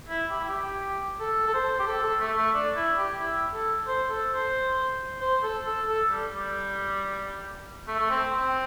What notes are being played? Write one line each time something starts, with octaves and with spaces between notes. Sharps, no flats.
E4
G4
E4
G4
A4
A4
C5
G4
A4
A4
A3
A3
D4
E4
G4
E4
A4
C5
A4
C5
C5
A4
A4
A4
G3
G3
A3
A3
C4
C4